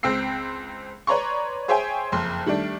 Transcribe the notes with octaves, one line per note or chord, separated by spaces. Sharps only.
C#2 C4 G5 E6 C7
B4 C#5 D5 A#5 C6 C#6
G#4 C5 C#5 E5 G5 G#5
F#1 F2 C6
D#3 G3 A3 D4